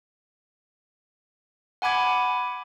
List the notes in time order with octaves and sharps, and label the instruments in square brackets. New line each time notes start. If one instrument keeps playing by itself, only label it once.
[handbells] F#5 G#5 B5 D6 G#6